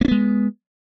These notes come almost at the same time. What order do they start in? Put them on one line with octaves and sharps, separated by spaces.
A#3 C#4 B3 G#3